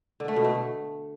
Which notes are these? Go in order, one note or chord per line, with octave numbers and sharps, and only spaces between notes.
D3
A3
B2
A3